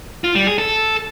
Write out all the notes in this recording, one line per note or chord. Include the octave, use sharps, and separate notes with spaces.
F4
G3
G#4
A4